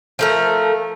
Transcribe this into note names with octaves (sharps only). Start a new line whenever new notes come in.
F3 A3 A#4